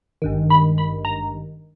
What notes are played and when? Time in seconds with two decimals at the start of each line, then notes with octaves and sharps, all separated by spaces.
0.22 G#1 G2 D#3
0.50 B5
0.78 B5
1.05 A#5